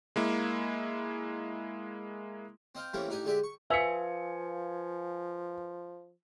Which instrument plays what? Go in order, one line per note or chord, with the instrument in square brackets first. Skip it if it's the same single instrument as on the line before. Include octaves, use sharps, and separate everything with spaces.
[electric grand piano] G#3 A#3 E4
[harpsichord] C4 D#5 F5 G5
E3 G3 A3 A#3 C4 C#4
A1 D4 D#4 G4 G#5
D3 G#3 G4 D5 E5
C#6
[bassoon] F3 [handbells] B4 F5 [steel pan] E5 [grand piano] G#5 C#7